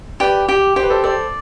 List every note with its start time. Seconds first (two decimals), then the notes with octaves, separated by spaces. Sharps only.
0.20 G4 B4 D5
0.48 G4
0.76 G4 C5
0.83 B4
0.90 A4 C5
1.03 A4 C5 D5